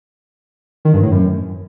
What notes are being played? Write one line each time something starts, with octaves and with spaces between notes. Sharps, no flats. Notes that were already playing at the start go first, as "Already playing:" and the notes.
D#3
G2
A2
F#2